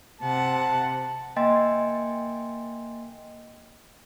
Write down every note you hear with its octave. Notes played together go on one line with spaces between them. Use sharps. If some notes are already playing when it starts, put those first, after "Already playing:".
C3 F#5 A5
A#3 D#5 G5 G#5 C6 A6